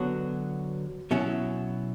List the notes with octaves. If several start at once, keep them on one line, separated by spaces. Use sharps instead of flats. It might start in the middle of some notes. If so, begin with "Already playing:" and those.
Already playing: D3 F#3 B3 F#4
B2 F#3 C#4 E4